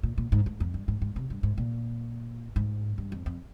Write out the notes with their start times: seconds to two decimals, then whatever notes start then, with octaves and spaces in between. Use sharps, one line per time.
0.03 A#2
0.18 A#2
0.32 G#2
0.46 G#2
0.60 F2
0.74 G2
0.88 G#2
1.02 G#2
1.16 C3
1.30 G2
1.43 G#2
1.58 A#2
2.56 G#2
2.98 G2
3.12 F2
3.26 F2